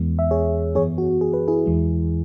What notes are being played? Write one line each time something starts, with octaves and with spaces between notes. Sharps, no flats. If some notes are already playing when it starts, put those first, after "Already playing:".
Already playing: E2 E3 G#3 B3
E5
G#4 C#5
F#2 E3 B3 G#4 C#5
F#4
G#4
B4
E4 G#4
E2 E3 G#3